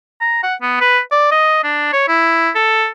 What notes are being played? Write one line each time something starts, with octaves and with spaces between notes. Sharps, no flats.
A#5
F#5
B3
B4
D5
D#5
D4
C#5
E4
A4